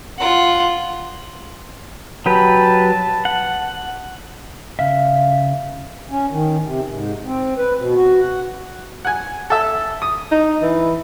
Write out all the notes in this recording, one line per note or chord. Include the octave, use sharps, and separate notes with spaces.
F4 F#5
F#3 G4 B4 A5
F#5
C#3 E5 F5
C#4
D#3
C3
G#2
C4
B4
B2
F#4
F#5
F#5 G#5
A4 E5
D#6
D#4
E3